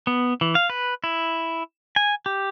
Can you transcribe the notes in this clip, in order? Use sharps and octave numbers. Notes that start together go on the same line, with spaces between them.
B3
E3
F5
B4
E4
G#5
G4